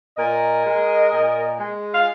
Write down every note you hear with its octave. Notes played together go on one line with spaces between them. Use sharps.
A#2 A#4 D#5
G#3
A#2
G#3
F5